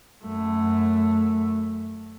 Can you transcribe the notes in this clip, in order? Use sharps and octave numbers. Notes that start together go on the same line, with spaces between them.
F#2 A3